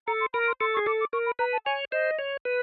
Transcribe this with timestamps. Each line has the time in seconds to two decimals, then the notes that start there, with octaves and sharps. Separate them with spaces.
0.07 A4 A#5
0.21 C6
0.34 A#4 B5
0.47 C6
0.60 A4 C6
0.74 C#6
0.77 G#4
0.86 A4 D6
1.01 D6
1.13 A#4 C#6
1.26 B5
1.39 B4 A#5
1.53 A5
1.66 C#5 G#5
1.92 C5 D#5
2.19 C#5
2.45 B4